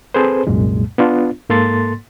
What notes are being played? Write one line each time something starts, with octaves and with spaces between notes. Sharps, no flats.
C4 G#4 A4 B4 C5
C2 F#2 A#2 G#3
B3 D4 F4
G#2 A#3 A4 C6 A6